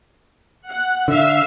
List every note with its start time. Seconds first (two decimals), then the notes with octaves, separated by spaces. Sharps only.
0.68 F#5
1.08 D3 E5 F5